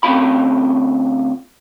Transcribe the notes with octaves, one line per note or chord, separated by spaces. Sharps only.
D2 C4 C#4 F4 B5